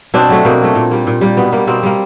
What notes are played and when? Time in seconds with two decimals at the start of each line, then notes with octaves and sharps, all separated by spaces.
0.14 B2 C4 D4
0.29 F#3 A3
0.45 B2 A#3 C4
0.60 F#3 A3
0.75 A#2
0.91 G3 A#3
1.07 A#2
1.21 G3 A#3
1.37 B2 B3
1.52 G3 A#3
1.67 B2 A#3 C4
1.83 G3 A#3